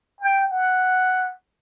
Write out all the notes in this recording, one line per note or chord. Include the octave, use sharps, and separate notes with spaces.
G5
F#5